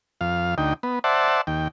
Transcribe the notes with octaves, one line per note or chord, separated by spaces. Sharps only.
F2 F5
D2 D#4 G5
B3
C5 D5 E5 F#5 A5
D#2 G5